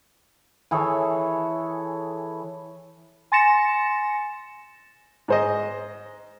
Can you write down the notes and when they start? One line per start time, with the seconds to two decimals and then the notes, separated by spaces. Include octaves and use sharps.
0.71 E3 G#4 A4 C#5
3.32 G#5 C6 A6 A#6 C#7 E7
5.28 G#2 C5 D#5